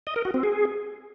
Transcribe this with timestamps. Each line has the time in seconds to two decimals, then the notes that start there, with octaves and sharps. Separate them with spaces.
0.07 D#5
0.16 A#4
0.25 F#4
0.34 C4
0.43 G#4